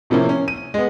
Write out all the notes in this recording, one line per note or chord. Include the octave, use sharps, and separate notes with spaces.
A2 C3 F3 A#3 C#4 E4
C#4
D#7
G#3 B3